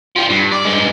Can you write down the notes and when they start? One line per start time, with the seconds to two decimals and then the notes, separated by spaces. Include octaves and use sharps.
0.16 F3 G3
0.30 G2
0.52 D5
0.65 G2 G#3